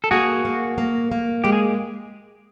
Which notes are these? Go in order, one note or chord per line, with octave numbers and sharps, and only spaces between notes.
A4
A#3 F#4 G#4
A#3
A#3
A#3
G#3 G4
G#4